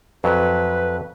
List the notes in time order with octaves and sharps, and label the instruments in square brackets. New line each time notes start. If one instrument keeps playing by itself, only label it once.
[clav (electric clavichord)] F2 F#3 [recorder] B4